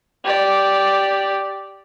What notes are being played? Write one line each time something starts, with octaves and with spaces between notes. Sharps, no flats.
G4 D5